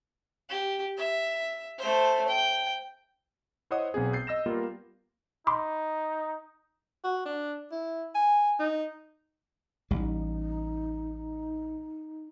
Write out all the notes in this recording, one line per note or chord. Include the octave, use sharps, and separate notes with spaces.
G4
E5
A3 C5
G5
E4 C5 C#5 D#5 F#5 D#6
B1 B3 C4 G#4
G6 A6 C7
D#5 E6 A#6 E7
G3 A#3 B3 F4 A#4
D#4 B5 C6 D6
F#4
D4
E4
G#5
D#4
A1 G3 D#4